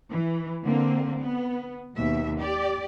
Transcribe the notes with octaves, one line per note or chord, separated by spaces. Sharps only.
E3
D3 A#3 C4
B3
D#2 B2 E5
G4 D5